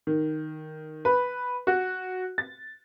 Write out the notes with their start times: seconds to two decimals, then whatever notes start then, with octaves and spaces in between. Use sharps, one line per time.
0.07 D#3
1.05 B4
1.67 F#4
2.38 A6